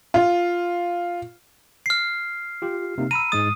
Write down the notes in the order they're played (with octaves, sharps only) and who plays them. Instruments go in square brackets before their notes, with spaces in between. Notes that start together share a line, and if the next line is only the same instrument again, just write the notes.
[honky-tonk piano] F4
[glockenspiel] F6 C7
[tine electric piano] F4 G4
C3 A#3 D#4
[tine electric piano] A#5 B5 E6 [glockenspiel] D#7
[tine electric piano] G#2 G#3 A6 [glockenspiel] D#6